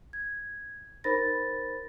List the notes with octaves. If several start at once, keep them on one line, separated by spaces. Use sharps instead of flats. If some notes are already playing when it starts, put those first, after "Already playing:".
G#6
D#4 A#4 C5 B5 A6 A#6